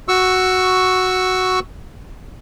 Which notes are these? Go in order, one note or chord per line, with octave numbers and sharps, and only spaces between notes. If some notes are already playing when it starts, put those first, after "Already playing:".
F#4 C#6 E6